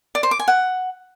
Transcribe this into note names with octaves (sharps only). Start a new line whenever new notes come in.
D5
C5
D6
G#5
F#5